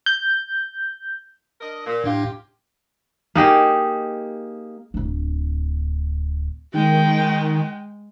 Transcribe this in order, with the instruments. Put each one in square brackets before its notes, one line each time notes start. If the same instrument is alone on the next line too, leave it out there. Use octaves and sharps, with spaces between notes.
[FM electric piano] G6
[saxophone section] D4 A#4 D#5
A#2
[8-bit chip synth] A2 D4 F5 [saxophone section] F4 G4
[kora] A#3 D#4 G4 G#4
[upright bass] D1 D4
[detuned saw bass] D#3 [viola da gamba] G#3 [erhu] G5